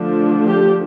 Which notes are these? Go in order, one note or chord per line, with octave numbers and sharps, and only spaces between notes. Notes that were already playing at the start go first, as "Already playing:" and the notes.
Already playing: D3 F3 A3 D4
G4